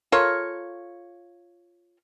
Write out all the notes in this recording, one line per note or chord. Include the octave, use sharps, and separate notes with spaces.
F4 A4 A#4 C#5